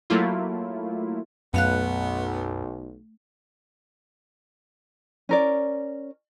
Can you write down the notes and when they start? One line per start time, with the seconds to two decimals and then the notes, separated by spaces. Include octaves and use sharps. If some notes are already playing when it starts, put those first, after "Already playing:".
0.10 F#3 A3 A#3 E4 F4
1.54 B1 F#2 A3 B3 F5 F#6
5.29 C#4 A#4 D5